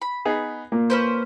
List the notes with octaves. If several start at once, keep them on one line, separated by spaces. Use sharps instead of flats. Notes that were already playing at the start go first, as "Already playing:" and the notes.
B5
B3 D#4 G#4
A#2 A#3
C#4 B4 C5